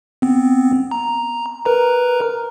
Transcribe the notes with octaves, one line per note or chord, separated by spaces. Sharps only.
B3 C4
A#5
A#4 B4 A#5